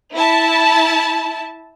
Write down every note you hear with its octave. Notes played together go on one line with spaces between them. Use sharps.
E4 A5